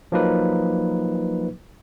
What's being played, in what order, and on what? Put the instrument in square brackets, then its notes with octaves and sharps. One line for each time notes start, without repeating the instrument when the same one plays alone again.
[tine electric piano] F3 F#3 A#3 D#4 B4